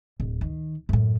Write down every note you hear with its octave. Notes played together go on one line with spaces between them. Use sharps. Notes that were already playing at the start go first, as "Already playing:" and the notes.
D1
D#3
F#2 A2